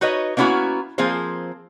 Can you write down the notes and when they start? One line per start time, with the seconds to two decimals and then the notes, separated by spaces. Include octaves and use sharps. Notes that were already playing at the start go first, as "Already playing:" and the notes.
0.01 D#4 F#4 B4 C#5 D#5
0.37 A#3 B3 C#4 E4 F#4 A#5
0.98 F3 A#3 C4 G#4 C5